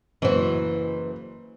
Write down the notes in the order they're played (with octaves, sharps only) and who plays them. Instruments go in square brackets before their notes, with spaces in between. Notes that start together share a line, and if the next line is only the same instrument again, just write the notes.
[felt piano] F#1 C5 [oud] E3 F#4